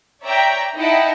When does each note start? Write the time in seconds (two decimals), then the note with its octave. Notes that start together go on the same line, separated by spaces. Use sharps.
0.22 C#5 D5 E5 G5 A#5
0.75 D#4 E4 D#5 F#5 G5 A5